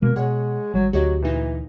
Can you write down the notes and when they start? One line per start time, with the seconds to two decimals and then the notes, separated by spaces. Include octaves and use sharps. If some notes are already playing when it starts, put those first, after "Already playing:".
0.02 B2 G#3 A#3
0.16 B2 G#3 C#5 F#5
0.74 G#1 F#3 G3
0.93 D2 F#3 F#4 G4 D#5
1.22 A#2 E3 D#4